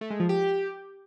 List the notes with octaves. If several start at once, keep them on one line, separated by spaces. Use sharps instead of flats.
A3
G#3
F3
G4